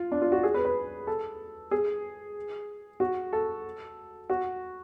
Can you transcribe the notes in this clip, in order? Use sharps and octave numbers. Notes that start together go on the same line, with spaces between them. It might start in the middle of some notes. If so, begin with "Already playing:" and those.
Already playing: F4
D4
F4
F#4
G#4
B4
B4
A4
G#4
F#4
A4
F#4